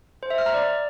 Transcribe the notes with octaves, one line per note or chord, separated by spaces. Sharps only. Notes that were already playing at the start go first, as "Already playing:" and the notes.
C5
E5
F6
A#5
D5